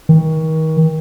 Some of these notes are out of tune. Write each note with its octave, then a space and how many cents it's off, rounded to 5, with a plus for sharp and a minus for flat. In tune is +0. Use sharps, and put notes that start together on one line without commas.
D#3 +35